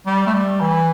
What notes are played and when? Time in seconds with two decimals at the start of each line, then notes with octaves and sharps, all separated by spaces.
0.06 G3
0.27 A3
0.33 G3
0.61 E3